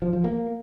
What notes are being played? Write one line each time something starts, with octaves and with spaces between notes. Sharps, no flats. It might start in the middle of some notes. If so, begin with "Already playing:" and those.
F3
F3
A#3